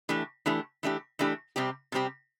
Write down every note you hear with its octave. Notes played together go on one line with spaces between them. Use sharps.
E3 A3 D4 G4
E3 A3 D4 G4
E3 A3 D4 G4
E3 A3 D4 G4
C3 G3 C4 G4
C3 G3 C4 G4